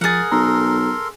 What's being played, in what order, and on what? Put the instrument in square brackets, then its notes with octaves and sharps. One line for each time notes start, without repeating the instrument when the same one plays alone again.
[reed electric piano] F3 A6 [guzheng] G#4 F#5 [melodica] A#4
[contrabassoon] B1 [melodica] A4 A#4 C6 [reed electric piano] A#5